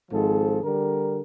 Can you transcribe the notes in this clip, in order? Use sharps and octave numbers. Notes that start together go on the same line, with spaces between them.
G#1 G#2 F3 G#4 A4
D3 G3 A#4